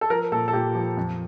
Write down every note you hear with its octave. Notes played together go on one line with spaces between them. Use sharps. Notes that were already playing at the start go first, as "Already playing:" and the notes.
A4
F3 A#4
A#2 A4
A4
A#2 G4
F3
F2